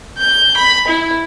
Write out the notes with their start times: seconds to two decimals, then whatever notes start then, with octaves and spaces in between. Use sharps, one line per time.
0.17 G6
0.57 B5
0.87 E4